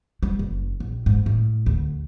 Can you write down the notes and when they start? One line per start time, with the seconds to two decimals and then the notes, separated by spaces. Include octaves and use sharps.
0.23 G3
0.39 F#1
0.80 A#1
1.06 G#2
1.26 A2
1.66 D2